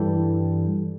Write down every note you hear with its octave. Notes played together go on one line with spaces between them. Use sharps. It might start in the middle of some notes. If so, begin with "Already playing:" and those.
Already playing: G2 E3 G3 A4